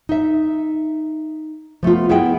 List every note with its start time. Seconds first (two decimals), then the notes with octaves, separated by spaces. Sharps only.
0.09 D#4 E5
1.83 F3 A3 B3 F4
2.09 B3 E4 G#4 E5 G5